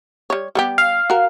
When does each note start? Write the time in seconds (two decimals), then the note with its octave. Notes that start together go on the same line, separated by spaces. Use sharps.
0.30 G3 C#5
0.55 G3 B3 G4
0.78 F5
1.10 F#4 A#4